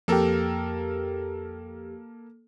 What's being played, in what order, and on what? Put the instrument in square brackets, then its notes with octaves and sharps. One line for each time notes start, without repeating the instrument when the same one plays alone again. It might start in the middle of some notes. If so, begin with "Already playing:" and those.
[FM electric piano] F2 G4 [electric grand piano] A#3 A4 A#4